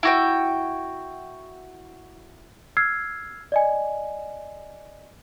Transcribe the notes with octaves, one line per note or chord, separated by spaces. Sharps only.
E4 F#4 G5
E6 F6 G#6 C7
D5 D#5 G#5